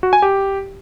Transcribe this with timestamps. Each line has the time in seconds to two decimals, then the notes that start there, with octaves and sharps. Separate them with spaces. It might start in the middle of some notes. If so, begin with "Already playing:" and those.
0.03 F#4
0.13 G#5
0.22 G4